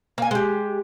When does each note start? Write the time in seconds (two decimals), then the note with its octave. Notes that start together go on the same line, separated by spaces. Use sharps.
0.18 A#3 G#5
0.31 G#3 G4